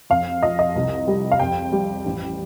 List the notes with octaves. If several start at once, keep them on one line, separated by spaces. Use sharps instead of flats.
F2 F5
F3 D#5
D#5
C2
G3
F5
F2 G5
G3
A1